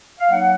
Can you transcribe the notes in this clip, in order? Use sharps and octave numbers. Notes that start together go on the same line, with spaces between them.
F5
F#3 A#3 D#4 F#5